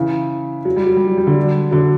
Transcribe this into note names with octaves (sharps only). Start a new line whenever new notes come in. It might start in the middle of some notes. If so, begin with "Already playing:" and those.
Already playing: C#3 E3
F#3
G3
F#3
G3
F#3
G3
D3 F#3
D3 F#3